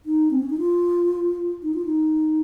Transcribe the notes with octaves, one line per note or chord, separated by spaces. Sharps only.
D#4
C4
C#4
D#4
F4
D#4
F4
D#4